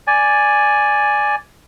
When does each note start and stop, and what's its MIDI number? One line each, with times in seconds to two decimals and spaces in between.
0.07 1.36 74
0.07 1.36 80